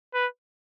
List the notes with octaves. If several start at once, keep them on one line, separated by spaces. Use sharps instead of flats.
B4